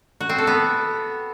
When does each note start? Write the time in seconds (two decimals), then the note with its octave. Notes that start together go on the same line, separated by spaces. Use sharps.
0.21 F#4
0.29 C4
0.38 A4
0.47 B3